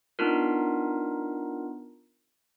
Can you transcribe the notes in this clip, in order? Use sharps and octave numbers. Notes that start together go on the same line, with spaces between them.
B3 D4 D#4 F4 A#4